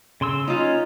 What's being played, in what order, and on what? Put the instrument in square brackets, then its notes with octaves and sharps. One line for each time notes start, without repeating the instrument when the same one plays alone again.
[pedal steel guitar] C#3 C6 E6
[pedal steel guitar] C#4 [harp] D#4 F4